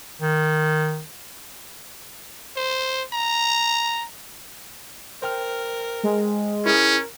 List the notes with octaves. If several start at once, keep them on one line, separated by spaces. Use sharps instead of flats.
D#3
C5
A#5
A#4 C5 G5 F6
G#3
C#4 E4 G#4 A#4